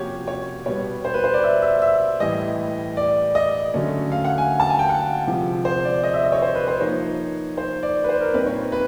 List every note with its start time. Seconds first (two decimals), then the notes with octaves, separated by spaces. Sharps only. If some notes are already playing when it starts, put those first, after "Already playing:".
Already playing: C3 F3 A#3 C#4 F#4 G4 C#5
0.27 C#5
0.66 B2 G3 B3 C#5
1.05 C5
1.14 B4
1.24 C5
1.34 D5
1.44 E5
1.62 E5
1.82 E5
2.20 A2 E3 G3 D#5
2.97 D5
3.35 D#5
3.74 D3 F#3 A3 C#4
4.12 F5
4.25 F#5
4.38 G#5
4.60 A5
4.70 G#5
4.79 G5
4.89 F#5
5.27 C3 F3 G#3
5.65 C5
5.85 D5
6.03 D#5
6.14 E5
6.23 D#5
6.32 C#5
6.42 C5
6.55 B4
6.68 C5
6.80 F3 A#3 D#4 C#5
7.58 C5
7.83 D5
8.04 B4
8.09 C5
8.21 A#4
8.34 A#2 G3 C4 D#4 B4
8.46 C#5
8.72 B4